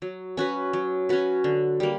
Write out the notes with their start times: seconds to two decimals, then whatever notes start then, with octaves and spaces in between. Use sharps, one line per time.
0.02 F#3
0.37 C#4 F#4 B4
0.73 F#3
1.09 C#4 F#4 B4
1.44 D3
1.80 G3 A#3